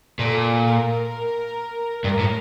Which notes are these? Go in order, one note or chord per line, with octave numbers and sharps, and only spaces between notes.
A#2 A4
A#4
G2 A#4
A2